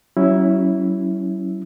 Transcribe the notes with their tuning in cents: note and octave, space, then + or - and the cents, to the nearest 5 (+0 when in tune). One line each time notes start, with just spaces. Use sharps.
F#3 +35 C#4 +0 E4 +0